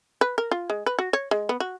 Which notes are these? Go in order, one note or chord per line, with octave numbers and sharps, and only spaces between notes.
B4
A#4
F4
G#3
B4
F#4
C#5
G#3
B3
F#4